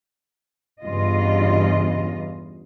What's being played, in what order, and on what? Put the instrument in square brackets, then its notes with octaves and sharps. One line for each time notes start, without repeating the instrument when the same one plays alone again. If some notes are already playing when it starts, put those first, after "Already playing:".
[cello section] E2 G2 C#3 F4 D#5